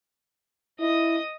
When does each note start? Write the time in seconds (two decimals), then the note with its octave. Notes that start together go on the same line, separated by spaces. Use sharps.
0.80 E4 D#5 D#6